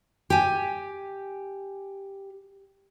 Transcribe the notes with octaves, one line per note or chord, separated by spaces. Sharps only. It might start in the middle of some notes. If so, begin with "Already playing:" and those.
G4 G#5